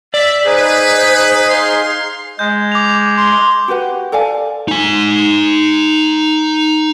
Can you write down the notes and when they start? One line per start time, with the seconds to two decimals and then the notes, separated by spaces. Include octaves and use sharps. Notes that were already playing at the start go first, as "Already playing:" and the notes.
0.14 D5 E5
0.46 D#4 G#4 B4 C5
1.49 F5 C6
2.39 G#3 G6
2.72 D6 F7
3.17 C6
3.68 F#4 G4 B4 F#5
4.12 A4 D5 F5 G#5
4.68 D#4 G#5